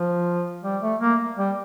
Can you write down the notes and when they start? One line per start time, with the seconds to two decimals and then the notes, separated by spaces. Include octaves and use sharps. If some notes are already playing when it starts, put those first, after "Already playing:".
Already playing: F3
0.64 G3
0.82 A3
1.00 A#3
1.37 G3